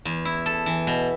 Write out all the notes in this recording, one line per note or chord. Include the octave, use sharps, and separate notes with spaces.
E2
E4
A4
E3
B2